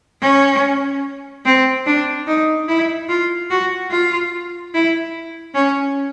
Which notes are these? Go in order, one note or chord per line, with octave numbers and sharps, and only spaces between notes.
C#4
C4
D4
D#4
E4
F4
F#4
F4
E4
C#4